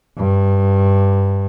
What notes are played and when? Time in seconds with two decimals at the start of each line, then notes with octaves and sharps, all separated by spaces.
0.17 G2